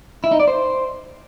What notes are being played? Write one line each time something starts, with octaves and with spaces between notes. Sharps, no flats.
E4
D#4
D5
C5